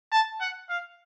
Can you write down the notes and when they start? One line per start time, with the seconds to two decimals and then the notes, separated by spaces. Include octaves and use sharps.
0.12 A5
0.41 F#5
0.69 F5